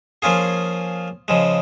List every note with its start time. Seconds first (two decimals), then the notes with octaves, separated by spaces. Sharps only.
0.22 F3 A#3 C#4 F4 G#4
1.28 C#3 F3 G#3